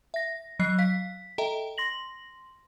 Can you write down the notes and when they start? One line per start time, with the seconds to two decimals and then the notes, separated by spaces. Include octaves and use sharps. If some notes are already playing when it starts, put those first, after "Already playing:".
0.14 E5 A#6
0.59 F#3 D#5 F#6 C7
0.78 F5 B6
1.38 A4 D#5 E5 G5 A#5
1.78 C6 A#6 F#7